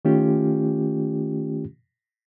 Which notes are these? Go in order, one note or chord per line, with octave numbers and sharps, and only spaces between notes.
D#3 A3 C#4 F4 G4